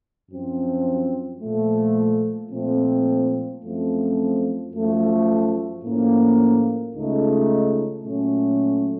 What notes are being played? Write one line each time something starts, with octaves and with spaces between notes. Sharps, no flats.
F#2 F3 C4
A#2 F3 A3
A#2 F3 A3 C4
F#2 F3 A3 C4
F#2 F3 A3
A2 F3 A#3 C#4
C#2 C#3 A3 D#4
A#2 F#3 A3 C#4